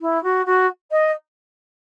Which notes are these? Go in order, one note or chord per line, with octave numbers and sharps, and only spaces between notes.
E4
F#4
F#4
D#5